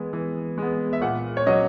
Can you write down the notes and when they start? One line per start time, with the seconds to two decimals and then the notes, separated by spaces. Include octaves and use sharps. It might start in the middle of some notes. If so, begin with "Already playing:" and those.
Already playing: E3 G#3 B3
0.13 E3
0.58 G#3 B3
0.93 E5
1.01 A#2 F#5
1.37 C#5
1.46 F#3 C#4 D#5